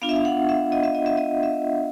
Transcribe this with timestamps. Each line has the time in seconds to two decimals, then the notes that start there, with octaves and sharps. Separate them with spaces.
0.02 B3 D4 F4 F5
0.09 E5
0.16 F5
0.25 F#5
0.49 E5
0.72 D#5
0.83 E5
0.95 D#5
1.06 E5
1.17 D#5
1.43 E5